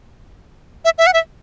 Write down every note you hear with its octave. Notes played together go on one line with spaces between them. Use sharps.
E5
E5
F#5
E5